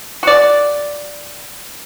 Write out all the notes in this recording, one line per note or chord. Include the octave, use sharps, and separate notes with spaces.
F#4 D5